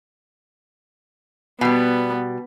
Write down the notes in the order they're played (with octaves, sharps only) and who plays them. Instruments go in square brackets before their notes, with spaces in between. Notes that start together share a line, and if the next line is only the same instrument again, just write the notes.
[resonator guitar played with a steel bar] B2 G3 [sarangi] B3